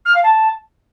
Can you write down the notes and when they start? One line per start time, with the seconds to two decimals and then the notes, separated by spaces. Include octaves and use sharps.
0.05 F6
0.14 F5
0.24 A5